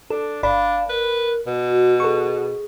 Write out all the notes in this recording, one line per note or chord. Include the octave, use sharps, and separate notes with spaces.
D4 A4
G1 D4 D5 F5 B5
A#4 B4
B2
F#4
G#4 A4 C#6